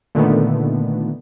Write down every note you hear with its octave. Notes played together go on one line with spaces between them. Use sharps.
A#2 D3 D#3 A3 B3